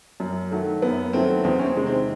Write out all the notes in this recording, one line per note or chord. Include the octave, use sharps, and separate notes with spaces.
F#2
D#3 F#3 A3
F#2 B3
D#3 F#3 A3 C4
E2 C4
C#4
C4
C3 D#3 G#3
C4